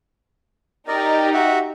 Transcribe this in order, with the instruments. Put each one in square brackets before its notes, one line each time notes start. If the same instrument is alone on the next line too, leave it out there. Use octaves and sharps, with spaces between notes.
[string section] D#4 G4 [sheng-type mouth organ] A#4 D5 D#5
[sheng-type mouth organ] F#4 E5 F#5